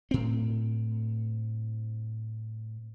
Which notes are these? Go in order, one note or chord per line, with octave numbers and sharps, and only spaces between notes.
A2 C4